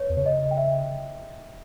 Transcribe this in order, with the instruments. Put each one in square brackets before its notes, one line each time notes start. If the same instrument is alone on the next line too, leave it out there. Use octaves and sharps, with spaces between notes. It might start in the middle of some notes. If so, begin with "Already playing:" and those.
Already playing: [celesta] B4 C#5
[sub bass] E2
[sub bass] C#3 [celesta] C#5
[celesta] D#5
G5
E5